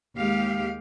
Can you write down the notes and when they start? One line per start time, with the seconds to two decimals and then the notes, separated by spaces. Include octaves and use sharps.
0.17 D#2 G#3 G4 F5